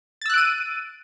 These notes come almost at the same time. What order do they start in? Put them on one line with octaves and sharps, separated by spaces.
A6 E6 F#6 D7 D#7